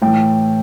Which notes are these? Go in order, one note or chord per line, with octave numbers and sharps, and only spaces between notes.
A2 E3 G5